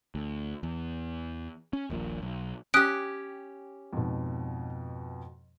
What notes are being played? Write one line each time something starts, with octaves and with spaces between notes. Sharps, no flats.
D2
E2
C#4
D#1 A#1 A#2
B1
C#4 G4 D#6 F#6 D7
F2 G#2 B2